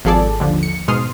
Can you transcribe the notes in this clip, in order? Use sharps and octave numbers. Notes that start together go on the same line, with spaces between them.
G#1 F3 G#4 A4 D5 A5
D#2 D3 F3
C#7
G#2 B2 C6 D#6 F6